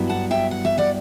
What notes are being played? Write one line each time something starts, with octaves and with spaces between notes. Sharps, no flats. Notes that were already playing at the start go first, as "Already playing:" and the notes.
Already playing: G2 F#3 B3 E4
F#5 A5
E5 G5
F#5
E5
D5 F#5